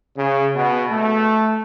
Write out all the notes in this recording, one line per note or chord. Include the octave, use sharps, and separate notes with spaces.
C#3
B2
A3